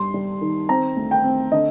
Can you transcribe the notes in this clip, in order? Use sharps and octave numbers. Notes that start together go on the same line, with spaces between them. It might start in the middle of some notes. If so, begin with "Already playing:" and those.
Already playing: G2 G3 C6
G3
D#3
C4 A#5
D2
G5
C4
D3 D#5